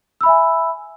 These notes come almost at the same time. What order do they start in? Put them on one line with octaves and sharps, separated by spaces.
E6 B5 E5 G#5